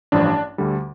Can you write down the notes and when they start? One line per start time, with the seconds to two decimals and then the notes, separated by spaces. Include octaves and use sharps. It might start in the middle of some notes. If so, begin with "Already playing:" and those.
0.12 A1 G2 F3 D4
0.58 D2 D3 G3